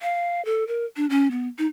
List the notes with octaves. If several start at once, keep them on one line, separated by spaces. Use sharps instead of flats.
F5
A4
A#4
D4
C#4
B3
D#4